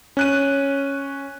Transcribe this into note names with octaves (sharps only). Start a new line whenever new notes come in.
C#4 F#6 D#7